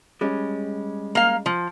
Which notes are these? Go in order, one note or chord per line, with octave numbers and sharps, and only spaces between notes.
G3 G#3 C#4
A#3 F5
F3